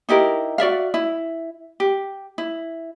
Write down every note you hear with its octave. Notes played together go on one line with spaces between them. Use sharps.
D#4 E4 G4 A#4
F#4 D5 E5 F5
E4
G4
E4